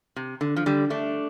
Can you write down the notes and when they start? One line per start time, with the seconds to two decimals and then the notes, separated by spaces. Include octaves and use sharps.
0.16 C3
0.41 D3
0.56 F3
0.66 D3 G3
0.90 A3 D4